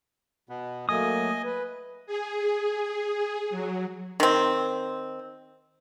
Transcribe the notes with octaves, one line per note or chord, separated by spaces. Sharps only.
B2 B3
F#3 A3 A#3 D#5 G#5 D#6
B4
G#4
G#4
F#3
D#3 C4